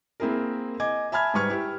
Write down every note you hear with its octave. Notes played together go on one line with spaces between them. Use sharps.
A#3 C4 E4 G#4 A#4
D#5 G#5 D6 G#6
E5 G#5 A5 B5 F6 G#6
G#2 G3 B4 C#6 F6 G#6
E4 G4